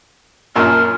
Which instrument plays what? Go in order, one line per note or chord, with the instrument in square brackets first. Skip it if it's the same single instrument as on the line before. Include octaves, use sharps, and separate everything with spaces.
[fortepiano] F#2 A#2 A5 [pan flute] A#4